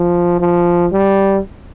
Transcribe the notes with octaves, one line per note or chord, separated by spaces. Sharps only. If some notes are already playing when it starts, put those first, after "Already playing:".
Already playing: F3
F3
G3